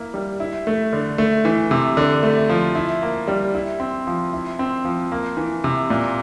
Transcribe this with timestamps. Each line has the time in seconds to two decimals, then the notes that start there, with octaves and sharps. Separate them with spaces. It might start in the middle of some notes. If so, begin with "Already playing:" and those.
Already playing: A#3 E4
0.14 G3
0.40 E4
0.67 A3
0.93 D3
1.18 A3
1.45 E3
1.71 C3
1.97 D3
2.23 A3
2.49 F3
2.75 E4
3.02 A#3
3.28 G3
3.54 E4
3.80 C4
4.07 F3
4.33 E4
4.59 C4
4.85 F3
5.12 A#3
5.37 E3
5.64 C3
5.90 A#2